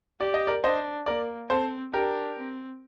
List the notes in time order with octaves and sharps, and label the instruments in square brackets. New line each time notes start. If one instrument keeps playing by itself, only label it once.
[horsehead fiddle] G4 [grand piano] D5
[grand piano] D#5
A#4 D5
[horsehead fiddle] D4 [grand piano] C5 D#5
[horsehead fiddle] A#3 [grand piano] A#4 D5
[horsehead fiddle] C4 [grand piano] A4 C5
[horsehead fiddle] D4 [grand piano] G4 A#4
[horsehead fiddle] C4